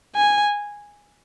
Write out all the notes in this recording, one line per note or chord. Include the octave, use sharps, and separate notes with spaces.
G#5